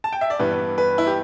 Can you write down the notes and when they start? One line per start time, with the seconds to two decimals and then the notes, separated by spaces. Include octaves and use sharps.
0.04 A5
0.12 G5
0.21 E5
0.30 D5
0.39 G2 E3 G3 B3 B4
0.78 B4
0.98 E4
1.07 G4